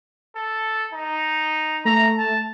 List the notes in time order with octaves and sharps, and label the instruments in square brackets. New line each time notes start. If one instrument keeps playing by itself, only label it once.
[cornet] A4
D#4
[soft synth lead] A3 [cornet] A#5
[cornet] A5